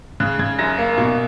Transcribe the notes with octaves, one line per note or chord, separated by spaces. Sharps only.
C#3 F#6
C#3 G#6
F#2 A#6
A#3
B2